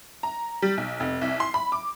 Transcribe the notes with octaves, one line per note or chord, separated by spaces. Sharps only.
A#5
G3
B1
F1
C2
C6
B5
D6